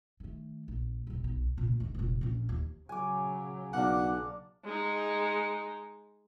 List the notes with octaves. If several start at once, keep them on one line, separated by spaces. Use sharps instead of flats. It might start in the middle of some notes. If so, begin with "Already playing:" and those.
D#3 A3
A#1
D#1 C3
B1
A#2 C#3
G#2 D3
F1 A#1
A#1 C#4
D#2
C#3 F#3 G#5 D6
B1 A#3 D4 F#5
G#3 D#4